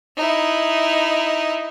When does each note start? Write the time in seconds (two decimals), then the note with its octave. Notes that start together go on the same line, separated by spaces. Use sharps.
0.17 D#4 E4